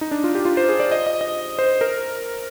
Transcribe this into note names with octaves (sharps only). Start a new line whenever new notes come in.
D#4
D4
F4
G4
F4
C5
G#4
D5
D#5
D#5
D#5
C5
A#4